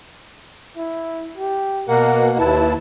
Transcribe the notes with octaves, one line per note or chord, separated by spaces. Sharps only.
E4
G4
B2 A#3 A#4 F#5
D#2 E4 B4 A5